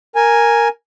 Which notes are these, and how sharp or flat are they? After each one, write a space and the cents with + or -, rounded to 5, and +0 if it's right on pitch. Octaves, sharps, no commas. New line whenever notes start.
A#4 +0 G#5 +0